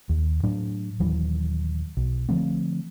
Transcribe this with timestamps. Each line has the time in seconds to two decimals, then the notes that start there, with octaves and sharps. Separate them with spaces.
0.09 D#2
0.43 A2 F#3 D4
1.00 D#1 D#2 E3 F#3
1.97 B1
2.29 D3 F3 A3 C4